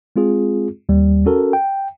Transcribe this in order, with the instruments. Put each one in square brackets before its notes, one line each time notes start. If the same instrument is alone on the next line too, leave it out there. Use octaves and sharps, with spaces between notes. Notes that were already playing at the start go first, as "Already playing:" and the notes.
[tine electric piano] G#3 C4 F4 G#4
D#2 G3
C#4 F#4 A4 A#4
G5